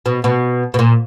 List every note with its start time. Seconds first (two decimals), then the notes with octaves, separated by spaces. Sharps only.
0.06 B2
0.24 B2
0.74 B2
0.79 A#2